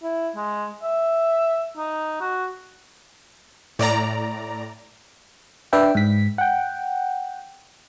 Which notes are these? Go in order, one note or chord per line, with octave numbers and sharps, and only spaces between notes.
E4
G#3
E5
D#4
F#4
A2 D5 A#5
D4 B4 D5 E5 G5
G#2 B6
F#5 G5